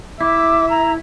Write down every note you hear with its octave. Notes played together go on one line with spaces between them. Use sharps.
E4 E5 D6
A#5